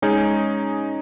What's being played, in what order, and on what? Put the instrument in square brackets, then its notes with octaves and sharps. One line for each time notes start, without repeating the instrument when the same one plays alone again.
[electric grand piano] G#3 D#4 G#4 [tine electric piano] C#4